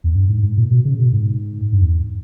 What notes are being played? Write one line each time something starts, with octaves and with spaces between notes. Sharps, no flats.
E2
G2
G#2
G#2
A#2
B2
C#3
B2
G#2
G2
E2